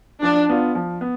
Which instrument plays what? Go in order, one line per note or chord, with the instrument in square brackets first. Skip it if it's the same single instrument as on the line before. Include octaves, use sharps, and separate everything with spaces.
[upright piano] F3 [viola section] D4
[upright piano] B3 F4
F3
B3